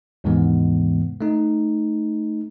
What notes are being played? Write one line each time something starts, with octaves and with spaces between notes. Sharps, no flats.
D#2 G#2 C3 E3 G#3 B3
A3 D#4